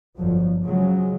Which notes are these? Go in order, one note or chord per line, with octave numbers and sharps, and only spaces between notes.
G1 F2 F3 F#3
C#3 F3 F#3 G#3